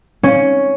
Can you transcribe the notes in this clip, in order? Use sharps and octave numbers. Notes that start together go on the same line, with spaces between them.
C#4